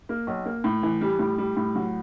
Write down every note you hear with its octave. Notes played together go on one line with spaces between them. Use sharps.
A#3
B1
A#3
A2
E3
G3
A2
G3
A2
F#3